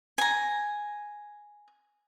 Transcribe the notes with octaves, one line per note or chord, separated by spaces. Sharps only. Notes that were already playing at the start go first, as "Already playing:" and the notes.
G#5 A#5